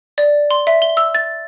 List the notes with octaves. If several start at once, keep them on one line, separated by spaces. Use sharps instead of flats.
D5
C6
E5
G7
E6
A6